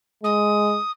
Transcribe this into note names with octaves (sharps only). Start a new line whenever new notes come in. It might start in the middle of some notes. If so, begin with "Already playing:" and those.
G#3 D#6